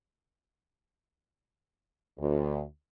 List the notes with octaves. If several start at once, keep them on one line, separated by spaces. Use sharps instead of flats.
D2